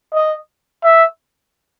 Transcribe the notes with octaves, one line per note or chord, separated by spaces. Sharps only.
D#5
E5